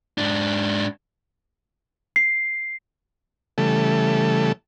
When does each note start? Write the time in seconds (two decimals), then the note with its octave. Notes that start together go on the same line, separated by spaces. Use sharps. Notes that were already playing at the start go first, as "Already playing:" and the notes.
0.18 G#2 D4
2.16 C7
3.58 C#3 E3 G3 A3 A4